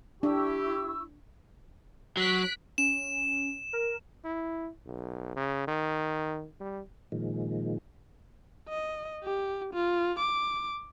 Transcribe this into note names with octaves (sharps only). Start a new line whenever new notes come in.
D4 E4 G4 C#6 E6
F#3 F#6 B6 D7
C#4 E7
A#4
E4
B1
C#3
D#3
G3
A#2 D#3 F3 G#3
D#5
G4
F4
D6